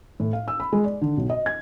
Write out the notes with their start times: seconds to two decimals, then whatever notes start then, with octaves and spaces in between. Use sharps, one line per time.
0.20 A2
0.33 F5
0.48 E6
0.60 B5
0.73 G#3
0.84 D5
1.02 D3
1.17 B1
1.30 D#5
1.46 G#6